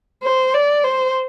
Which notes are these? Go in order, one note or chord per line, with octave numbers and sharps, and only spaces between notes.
C5
D5
C5